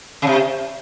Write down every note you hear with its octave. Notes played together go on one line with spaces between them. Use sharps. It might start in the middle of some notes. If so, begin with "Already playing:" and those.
C#3
C3